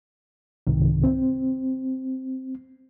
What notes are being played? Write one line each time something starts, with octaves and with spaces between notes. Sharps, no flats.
C2 G#2 C3 D#3
C4